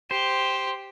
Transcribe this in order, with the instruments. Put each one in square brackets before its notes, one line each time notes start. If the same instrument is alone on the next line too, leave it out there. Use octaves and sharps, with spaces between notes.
[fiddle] G4 [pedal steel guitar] C5